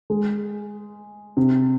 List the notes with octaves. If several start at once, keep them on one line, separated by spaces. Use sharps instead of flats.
G#3
C3